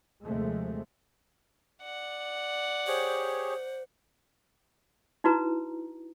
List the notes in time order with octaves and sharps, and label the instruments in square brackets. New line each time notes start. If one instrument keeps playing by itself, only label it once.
[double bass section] D#2 C3 F3 G#3 A3
[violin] D5 F#5
[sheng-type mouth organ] G4 G#4 C#5 [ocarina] C5
[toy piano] D#4 E4 F#4 B4 A#5